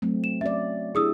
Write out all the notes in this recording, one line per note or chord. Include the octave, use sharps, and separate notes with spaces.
F#3 A3 C4
E7
C#4 F#4 D5 E5
D4 E4 G4 G#4 D#6 E6